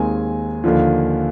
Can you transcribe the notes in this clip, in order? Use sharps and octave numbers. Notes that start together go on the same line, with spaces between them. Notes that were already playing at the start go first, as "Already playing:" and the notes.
Already playing: D#2 D#3 G#3 C4 G#5
D#2 D3 F3